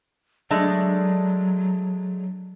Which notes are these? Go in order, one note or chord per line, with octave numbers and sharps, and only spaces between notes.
F#3 G#3 A3 D4